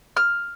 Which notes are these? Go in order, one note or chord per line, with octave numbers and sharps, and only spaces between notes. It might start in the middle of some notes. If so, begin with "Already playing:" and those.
F6